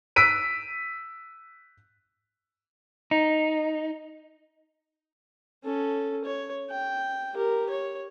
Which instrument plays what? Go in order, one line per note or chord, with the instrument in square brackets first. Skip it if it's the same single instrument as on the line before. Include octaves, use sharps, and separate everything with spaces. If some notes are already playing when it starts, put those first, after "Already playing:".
[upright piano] E6 B6 D7 D#7
[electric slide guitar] D#4
[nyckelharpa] C#4 A4
C#5
G5
G4 A#4
C#5